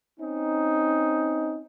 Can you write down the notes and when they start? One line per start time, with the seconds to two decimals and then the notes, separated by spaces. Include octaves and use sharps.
0.20 C4 C#4 D#4